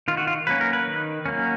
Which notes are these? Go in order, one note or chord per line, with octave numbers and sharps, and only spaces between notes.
D#3 F4
F#4
F4
F#3 A#3 C#4 B4
A#4
B4
D#3
F#3 A#3 C#4